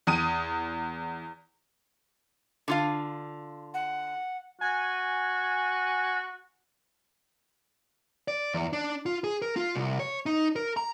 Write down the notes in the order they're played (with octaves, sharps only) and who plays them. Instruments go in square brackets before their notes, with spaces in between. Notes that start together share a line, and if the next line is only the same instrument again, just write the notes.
[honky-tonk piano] E2 D#6 D#7
[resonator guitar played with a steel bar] D3 F4 F5
[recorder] F#5
[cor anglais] F#4 [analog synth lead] G#5
[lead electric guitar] D5
E2
D4
F4
G#4
A#4
F4
C2
C#5
D#4
A#4
A#5